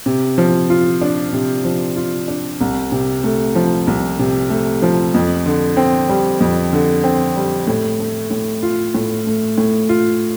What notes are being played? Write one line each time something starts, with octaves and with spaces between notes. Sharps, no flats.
C3
F3
F4
D4
C3
F3
F4
D4
C2
C3
A3
F3
C2
C3
A3
F3
F2
D3
C4
G3
F2
D3
C4
G3
A2
A3
A2
F4
A2
A3
A2
F4